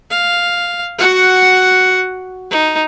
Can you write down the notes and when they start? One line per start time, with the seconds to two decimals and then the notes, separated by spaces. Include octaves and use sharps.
0.11 F5
0.99 F#4 F#5
2.51 D#4